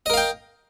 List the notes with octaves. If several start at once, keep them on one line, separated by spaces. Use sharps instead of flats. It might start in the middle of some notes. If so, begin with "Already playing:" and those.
A#4 D#5 F5 G5